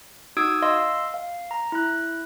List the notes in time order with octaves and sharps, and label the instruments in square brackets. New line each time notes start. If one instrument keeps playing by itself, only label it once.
[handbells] D#4 F#4 D#6 E6 G#6 D7
D#5 F5 C6 E6
F5
A#5
E4 F#6